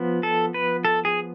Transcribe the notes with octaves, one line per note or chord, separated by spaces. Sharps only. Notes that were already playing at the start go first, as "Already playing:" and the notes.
Already playing: F3 B3
A4
B4
A4
G#4